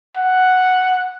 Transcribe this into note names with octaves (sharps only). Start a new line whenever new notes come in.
F#5